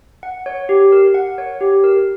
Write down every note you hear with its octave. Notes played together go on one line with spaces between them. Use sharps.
F#5
C#5
G4
A#4
F#5
C#5
G4
A#4